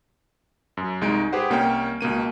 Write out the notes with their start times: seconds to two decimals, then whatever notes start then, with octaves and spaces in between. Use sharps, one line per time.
0.77 F#2
1.01 C2 G#3 D#4 D7
1.33 G4 G#4 B4 C5 F#5
1.50 C2 A#3 C#4 C#5 G5
2.01 C#2 B2 A#3 D#7